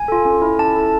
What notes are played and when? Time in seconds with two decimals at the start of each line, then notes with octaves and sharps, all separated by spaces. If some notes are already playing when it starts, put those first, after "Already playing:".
Already playing: G#5
0.08 F4 A4
0.25 C#4
0.42 E4 A4
0.59 C#4 A5
0.76 E4 A4